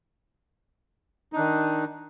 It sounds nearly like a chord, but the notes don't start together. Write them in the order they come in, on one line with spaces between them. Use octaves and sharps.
D#4 D4 D#3